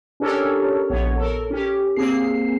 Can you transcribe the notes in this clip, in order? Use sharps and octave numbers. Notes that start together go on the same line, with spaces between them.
C#4 D4 G4 A4 A#4 C#5
A#1 B3 C#5
A4 A#4
C#4 G4
A#3 C4 G#4 C7